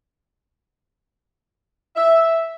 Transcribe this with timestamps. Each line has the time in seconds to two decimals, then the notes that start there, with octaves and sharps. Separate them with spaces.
1.96 E5